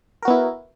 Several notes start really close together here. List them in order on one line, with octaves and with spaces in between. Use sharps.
A#4 F#4 B3 E4